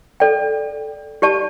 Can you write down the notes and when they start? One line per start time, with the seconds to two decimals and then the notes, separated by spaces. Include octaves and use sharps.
0.20 A4 D5 G5
1.22 G4 D5 A5 C#6